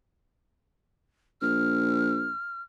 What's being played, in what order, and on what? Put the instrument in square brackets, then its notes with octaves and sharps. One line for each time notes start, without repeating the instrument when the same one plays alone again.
[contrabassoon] A#1 [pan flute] F6